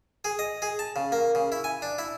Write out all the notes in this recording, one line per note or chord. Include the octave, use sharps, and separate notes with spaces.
G#4
D#5
G#4
A5
C#3
A#3
C#3
E4
G#5
D4
E4